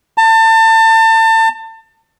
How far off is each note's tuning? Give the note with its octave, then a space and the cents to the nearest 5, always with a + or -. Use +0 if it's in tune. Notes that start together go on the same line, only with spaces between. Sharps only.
A5 +30